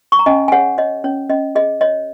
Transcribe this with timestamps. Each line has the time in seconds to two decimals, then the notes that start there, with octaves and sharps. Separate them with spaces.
0.12 C#6
0.19 A#5
0.26 C#4 D#5 G#5
0.48 G#5
0.52 G#4 C#5 F#5
0.78 C#5 D#5
1.04 C#4 C#5
1.29 C#4 D#5
1.55 G#4 D#5
1.81 C#5 D#5